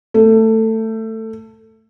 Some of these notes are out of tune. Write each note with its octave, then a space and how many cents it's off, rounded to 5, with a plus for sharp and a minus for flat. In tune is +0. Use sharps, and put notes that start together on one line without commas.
A3 +15